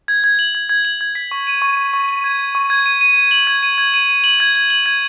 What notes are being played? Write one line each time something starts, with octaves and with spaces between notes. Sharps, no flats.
G#6
G#6
F#7
G#6
G#6
F#7
G#6
B6
C#6
D#7
C#6
C#6
C#6
C#6
G#6
C#6
C#6
G#6
D#7
D#7
D#7
F#7
G#6
D#7
G#6
D#7
D#7
F#7
G#6
G#6
F#7
G#6